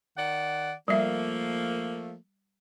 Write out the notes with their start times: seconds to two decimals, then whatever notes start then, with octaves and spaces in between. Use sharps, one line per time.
0.18 D#3 D5 F#5
0.88 F3 G3 A3 A#3 E5